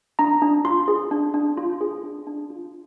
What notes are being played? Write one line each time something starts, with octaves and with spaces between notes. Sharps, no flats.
D4 A#5
D4
F4 C6
G#4
D4
D4
F4
G#4
D4
D4
F4